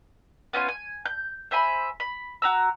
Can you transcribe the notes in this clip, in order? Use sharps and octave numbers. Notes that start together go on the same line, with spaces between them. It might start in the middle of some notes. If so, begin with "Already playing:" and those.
B3 C#4 F4 G#5
G#5
G6
C5 E5 G#5 B5
B5
F#4 A#5 E6